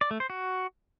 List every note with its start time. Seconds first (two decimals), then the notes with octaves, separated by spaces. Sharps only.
0.01 D5
0.11 A3
0.20 C5
0.30 F#4